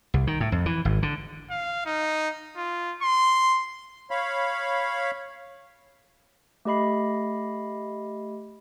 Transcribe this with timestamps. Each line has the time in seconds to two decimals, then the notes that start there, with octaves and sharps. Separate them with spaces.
0.14 C2
0.27 D#3
0.40 A2
0.52 F2
0.66 E3
0.85 G#1
1.03 D3
1.50 F5
1.86 D#4
2.57 F4
3.02 C6
4.11 C#5 F5 B5
6.65 A3 G4 D#5 B5 C7